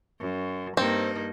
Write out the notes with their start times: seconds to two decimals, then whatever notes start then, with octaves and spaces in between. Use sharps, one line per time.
0.20 F#2
0.77 G2 A#3 C4 D#4